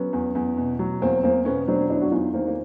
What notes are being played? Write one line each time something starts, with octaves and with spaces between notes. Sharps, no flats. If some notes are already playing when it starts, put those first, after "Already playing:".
Already playing: F#3 B3 C#4
E2
E2
B2
F#3
E2 A#3 C4
E2 A#3 C4
B2 B3 C#4
F#3 C4 D4
E2 D4 E4
F#4
E2 D#4 F4
D#3 A#3 C4
A#3